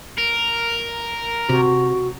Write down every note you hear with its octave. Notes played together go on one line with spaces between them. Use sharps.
A#4
C3 F#4